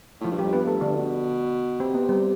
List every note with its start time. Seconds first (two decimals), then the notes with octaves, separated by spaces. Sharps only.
0.21 A2 F3 F4
0.31 G2
0.38 G3 G4
0.43 F2
0.53 G2 B3 B4
0.67 A3 A4
0.81 D3 D4
0.95 B2
1.80 C3 C4
1.94 B3
2.09 G3